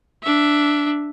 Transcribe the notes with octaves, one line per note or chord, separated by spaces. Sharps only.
D4 E5